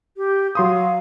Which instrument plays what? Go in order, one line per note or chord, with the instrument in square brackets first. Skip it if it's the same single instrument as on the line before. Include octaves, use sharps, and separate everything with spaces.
[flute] G4
[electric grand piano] F#3 C6 D#6 [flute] F5